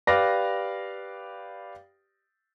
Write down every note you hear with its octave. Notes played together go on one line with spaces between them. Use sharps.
G4 B4 D5 F5 A#6